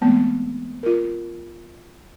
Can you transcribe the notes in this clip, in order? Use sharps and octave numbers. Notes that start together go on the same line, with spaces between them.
E3 G#3 A3 B3 C4
F4 A#4